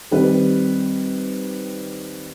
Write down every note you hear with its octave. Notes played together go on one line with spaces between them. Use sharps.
D#3 G3 C4 B4